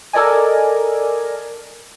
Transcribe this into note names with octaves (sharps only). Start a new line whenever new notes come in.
A4 A#4 D5 D#5 G#5